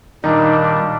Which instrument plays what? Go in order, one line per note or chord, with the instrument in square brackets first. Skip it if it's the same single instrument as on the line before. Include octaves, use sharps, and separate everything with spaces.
[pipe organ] A#2 G3 D4 [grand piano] D#3 D#4